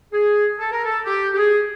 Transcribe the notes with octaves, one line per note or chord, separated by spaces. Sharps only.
G#4
A4
A#4
A4
G4
G4
G#4